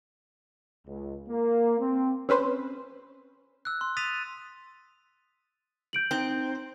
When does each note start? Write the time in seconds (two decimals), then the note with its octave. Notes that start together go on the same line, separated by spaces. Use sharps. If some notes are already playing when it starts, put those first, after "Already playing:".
0.87 C#2
1.29 A#3
1.79 C4
2.29 C4 C#4 B4 C5
3.65 E6 F#6
3.81 C6
3.97 D#6 A6 B6 D#7 F7
5.93 G6 D7 F#7
6.11 C4 D#4